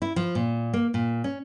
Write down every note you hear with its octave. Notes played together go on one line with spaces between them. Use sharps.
E4
F3
A#2
A#3
A#2
C#4